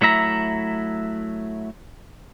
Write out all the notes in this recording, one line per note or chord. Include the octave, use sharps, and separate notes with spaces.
F#3 A3 E4 E5 A#5